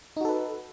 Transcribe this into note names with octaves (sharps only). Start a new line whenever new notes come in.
D#4 F#4 A4 B4